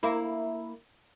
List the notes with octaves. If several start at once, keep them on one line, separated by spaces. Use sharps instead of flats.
A#3 E4